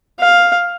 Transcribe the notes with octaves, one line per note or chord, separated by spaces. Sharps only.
F5